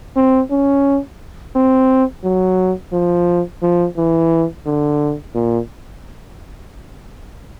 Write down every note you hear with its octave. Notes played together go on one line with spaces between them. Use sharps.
C4
C#4
C4
F#3
F3
F3
E3
D3
A#2